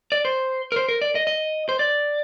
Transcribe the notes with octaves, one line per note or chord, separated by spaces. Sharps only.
D5
C5
A#4
C5
A#4
D5
D#5
D#5
C5
D5